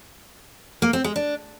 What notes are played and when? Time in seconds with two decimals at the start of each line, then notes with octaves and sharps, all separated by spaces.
0.82 A#3
0.93 C4
1.04 G#3
1.16 D4